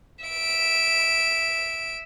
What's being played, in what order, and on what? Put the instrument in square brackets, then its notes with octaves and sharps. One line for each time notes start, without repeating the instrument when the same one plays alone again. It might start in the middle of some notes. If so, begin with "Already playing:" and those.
[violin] E5 D7